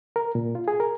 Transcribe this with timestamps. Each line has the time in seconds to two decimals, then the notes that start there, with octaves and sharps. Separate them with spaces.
0.16 A#4
0.35 A#2
0.55 F4
0.68 G#4
0.80 A#4